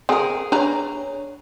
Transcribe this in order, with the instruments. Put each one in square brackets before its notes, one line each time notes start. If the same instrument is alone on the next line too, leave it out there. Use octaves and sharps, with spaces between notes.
[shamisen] C4 A#4 [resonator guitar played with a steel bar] G#4
[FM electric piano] D4 C#5 [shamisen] B4 D5 A#5